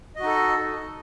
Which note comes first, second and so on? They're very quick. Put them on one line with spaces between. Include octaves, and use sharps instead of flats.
D#5 F#4 D#4 A4